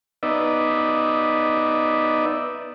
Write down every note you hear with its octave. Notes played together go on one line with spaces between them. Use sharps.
B3 D#4 D5 E5